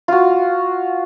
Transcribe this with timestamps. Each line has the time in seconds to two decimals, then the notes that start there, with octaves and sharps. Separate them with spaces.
0.08 F4 F#4